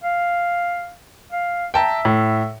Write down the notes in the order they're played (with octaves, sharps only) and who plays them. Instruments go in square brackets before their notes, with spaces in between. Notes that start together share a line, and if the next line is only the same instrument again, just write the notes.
[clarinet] F5
F5
[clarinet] E5 [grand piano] G5 A5 A#5
[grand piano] A2